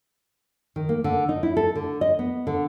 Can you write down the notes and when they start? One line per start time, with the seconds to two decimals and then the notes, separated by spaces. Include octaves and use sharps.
0.76 D#3
0.89 A#3
1.04 D3
1.29 D#4
1.43 E4
1.57 A4
1.76 D3
2.01 D#5
2.19 B3
2.47 D3